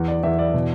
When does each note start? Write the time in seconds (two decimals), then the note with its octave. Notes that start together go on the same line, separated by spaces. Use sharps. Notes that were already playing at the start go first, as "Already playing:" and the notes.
Already playing: E2
0.08 D5
0.23 E2 E5
0.39 D5
0.54 B2